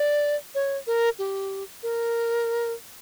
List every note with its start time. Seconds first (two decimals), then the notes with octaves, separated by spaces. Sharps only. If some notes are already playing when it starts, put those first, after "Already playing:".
Already playing: D5
0.55 C#5
0.87 A#4
1.19 G4
1.83 A#4